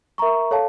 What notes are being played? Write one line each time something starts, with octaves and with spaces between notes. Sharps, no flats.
A#4 E5 A#5 C#6
A4 C#5 F5 A5